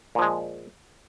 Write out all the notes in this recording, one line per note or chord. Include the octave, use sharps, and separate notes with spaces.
A#2 F3 G#3